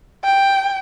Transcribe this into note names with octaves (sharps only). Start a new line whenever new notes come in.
G5